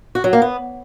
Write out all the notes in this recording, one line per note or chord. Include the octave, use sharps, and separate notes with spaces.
F#4
F#3
A#3
B3